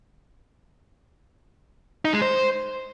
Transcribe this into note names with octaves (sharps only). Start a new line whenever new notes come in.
D#4
G#3
C5